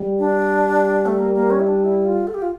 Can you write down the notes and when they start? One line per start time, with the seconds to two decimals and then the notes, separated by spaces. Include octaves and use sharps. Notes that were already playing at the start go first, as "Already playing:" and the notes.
Already playing: G3
0.19 D4
1.06 A3
1.18 A#3
1.34 A#3
1.50 C#4
1.59 E4
1.67 D4
1.84 E4
2.06 F4
2.27 A4
2.34 G4
2.42 F4